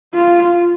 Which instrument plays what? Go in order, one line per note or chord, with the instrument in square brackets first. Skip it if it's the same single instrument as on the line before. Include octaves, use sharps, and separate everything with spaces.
[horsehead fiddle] F4